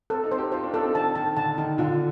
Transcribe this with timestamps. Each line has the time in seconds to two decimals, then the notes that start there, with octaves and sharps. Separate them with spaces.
0.10 C4 A4
0.24 D#4
0.32 C5
0.38 G4
0.52 F4 C5
0.64 D4
0.74 D4 A4
0.83 C4
0.95 D#3 A5
1.15 D#3 A5
1.37 D3 A5
1.58 D#3 D#4
1.78 D3 F4